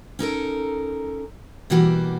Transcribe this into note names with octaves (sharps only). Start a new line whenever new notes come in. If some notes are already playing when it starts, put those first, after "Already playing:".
C#4 D#4 A4 A#4
B2 E3 G3 A#3 F#4 G4